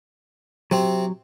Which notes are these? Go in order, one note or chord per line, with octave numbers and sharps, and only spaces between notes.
C3 F#3 C4